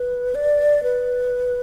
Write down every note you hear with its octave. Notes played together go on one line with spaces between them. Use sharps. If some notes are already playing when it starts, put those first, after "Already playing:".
Already playing: B4
D5
B4